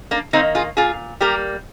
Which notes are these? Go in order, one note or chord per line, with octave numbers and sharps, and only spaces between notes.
A#3 D4
D#3 A#3 C4 D#4
F4 G#4
A#2 F4 G#4
G3 A#3 G4 A#4